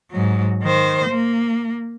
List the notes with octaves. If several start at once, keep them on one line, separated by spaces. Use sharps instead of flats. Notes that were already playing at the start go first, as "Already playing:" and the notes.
G#2 F#3
D#3 C5
A#3